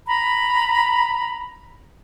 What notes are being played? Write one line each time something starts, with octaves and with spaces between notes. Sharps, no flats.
A#5 B5